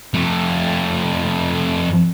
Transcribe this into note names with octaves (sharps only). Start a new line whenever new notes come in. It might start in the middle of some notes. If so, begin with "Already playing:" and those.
F2 A3